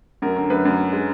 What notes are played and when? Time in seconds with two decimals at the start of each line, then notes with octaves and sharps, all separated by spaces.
0.22 F#2 A#4
0.36 D3
0.50 F#2 B4
0.65 F#2
0.80 D3
0.93 G#3